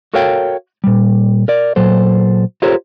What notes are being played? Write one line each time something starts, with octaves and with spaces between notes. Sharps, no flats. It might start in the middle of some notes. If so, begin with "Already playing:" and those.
F#4 A4 A#4 C#5 F5 G5
A#2 G3
A#4 D5
A#2 F#3 A4 C5
F4 G4 A4 A#4 C5 C#5